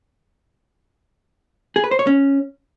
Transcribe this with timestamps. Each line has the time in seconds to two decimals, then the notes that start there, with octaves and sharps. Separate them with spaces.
1.76 G#4
1.84 B4
1.91 C5
1.99 C#5
2.07 C#4